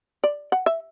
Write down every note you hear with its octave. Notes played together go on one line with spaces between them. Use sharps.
D5
F#5
E5